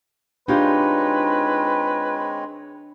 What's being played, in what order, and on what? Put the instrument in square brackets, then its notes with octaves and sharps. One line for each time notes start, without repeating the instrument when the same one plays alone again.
[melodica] G#3 C4 C#5 [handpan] D4 [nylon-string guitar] D#4 F4 G4 [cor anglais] B4